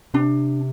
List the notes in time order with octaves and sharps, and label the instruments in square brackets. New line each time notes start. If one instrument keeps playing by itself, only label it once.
[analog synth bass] C3 [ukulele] D4